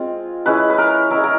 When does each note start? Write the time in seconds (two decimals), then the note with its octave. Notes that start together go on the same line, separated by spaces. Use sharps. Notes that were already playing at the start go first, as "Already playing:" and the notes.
Already playing: G#3 C4 F4
0.46 G#3 C#4 E4 B4
0.70 B4
0.78 A#4
1.10 G#3 C#4 E4 A#4
1.24 A#4